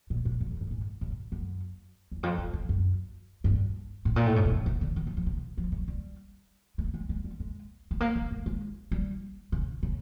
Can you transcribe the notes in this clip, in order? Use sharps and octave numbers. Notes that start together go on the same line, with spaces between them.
A#2
G#2
G2
F2
G2
G#2
G2
F#2
E2
F2
E2
F2
F#2
G2
A2
A#2
A2
G#2
A2
B2
C3
D3
D#3
F3
F3
C3
F3
F#3
G3
A3
G#3
G#3
G3
G#3
A3
A#3
A#3
A3
G#3
G3
C#3
C#3